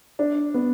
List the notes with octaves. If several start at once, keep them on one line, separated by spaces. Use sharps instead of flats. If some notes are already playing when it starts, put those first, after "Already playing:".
D4
B3